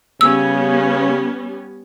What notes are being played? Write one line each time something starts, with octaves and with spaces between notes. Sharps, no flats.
C#3 G3 B3 C#4 E6